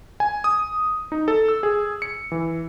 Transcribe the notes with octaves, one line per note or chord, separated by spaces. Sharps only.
G#5
D#6
D#4
A4
E6
G#4
C#7
E3